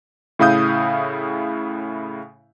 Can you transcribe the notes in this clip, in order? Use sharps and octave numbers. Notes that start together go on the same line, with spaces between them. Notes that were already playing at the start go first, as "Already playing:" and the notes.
A2 C#3 E4 F5 D#6 G6